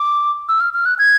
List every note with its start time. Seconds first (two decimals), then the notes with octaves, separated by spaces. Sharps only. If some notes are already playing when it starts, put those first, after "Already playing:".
Already playing: D6
0.49 E6
0.60 F6
0.74 F6
0.86 F#6
0.99 G#6